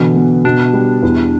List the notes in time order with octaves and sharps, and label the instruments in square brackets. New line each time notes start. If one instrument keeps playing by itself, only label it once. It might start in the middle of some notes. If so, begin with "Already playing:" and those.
Already playing: [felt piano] B2 D3 [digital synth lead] E3
[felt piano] B3
[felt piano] B2 [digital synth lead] D4
[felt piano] G3
E2